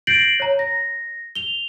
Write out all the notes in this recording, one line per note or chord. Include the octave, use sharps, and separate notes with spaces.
G6 A6 A#6 C7 D7 F#7
C#5 A#5
A#6
F7 G7